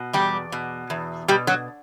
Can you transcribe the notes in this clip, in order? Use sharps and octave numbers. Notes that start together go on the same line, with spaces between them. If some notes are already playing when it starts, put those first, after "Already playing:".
Already playing: B2
E2 G3 G4
B2
E2
B2 G3 G4
F#3 F#4